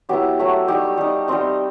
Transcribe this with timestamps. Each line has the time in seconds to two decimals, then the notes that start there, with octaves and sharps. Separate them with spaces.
0.09 F#3 B3 E4 G4
0.39 F#3 A3 E4
0.68 G3 D#4 G4
0.97 G3 D#4
1.28 G3 C4 D#4